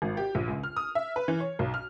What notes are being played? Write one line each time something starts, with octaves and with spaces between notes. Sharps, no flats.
G#1
G4
A#1
C#2
F6
D#6
E5
B4
E3
C#5
B1
F6